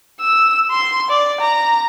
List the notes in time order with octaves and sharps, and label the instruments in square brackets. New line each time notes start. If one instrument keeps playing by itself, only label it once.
[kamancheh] E6
C6
D5
A#5